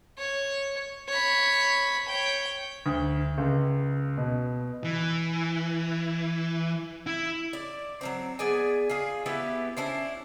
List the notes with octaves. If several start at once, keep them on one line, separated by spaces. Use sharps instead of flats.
C#5
C#5 B5
C#5 G5
D2
C#2
B2
E3
E4
D5
F#3 A#3 C4
B3 G#4 D5 G#5
F4 G#4
B3 E4 G4 B4
C#4 D4 E4 C5